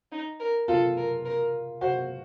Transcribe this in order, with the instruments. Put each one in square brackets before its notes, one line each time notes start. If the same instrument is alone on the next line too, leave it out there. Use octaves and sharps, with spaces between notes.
[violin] D#4
A#4
[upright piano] F4 [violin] A4
[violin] A#4
A#4
[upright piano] F#4 [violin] C5